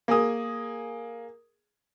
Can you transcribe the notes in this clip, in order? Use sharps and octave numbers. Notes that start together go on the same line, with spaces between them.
A#3 G#4 D#6